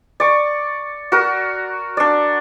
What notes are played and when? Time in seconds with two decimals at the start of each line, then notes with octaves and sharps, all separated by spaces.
0.20 D5 C#6
1.12 F#4 A#4
1.97 D4 D5